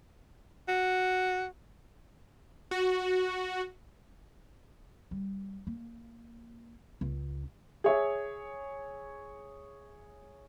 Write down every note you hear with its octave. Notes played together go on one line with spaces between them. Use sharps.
F#4
F#4
G3
A#3
C#2
G#4 C#5 E5